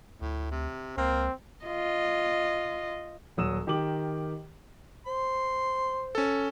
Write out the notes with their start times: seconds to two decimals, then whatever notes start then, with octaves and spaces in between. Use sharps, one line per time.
0.22 D2 A2
0.51 C3
0.97 C#2 A#3 C4
1.65 F4 D#5
3.37 D#1 F#3 D#6 E6 E7
3.67 D#3 G4 A#4 D6 F#7
5.06 C5 C6
6.15 C#4 A4